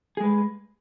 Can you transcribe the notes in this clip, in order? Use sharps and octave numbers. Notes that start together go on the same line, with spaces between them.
G#3 G#4 B4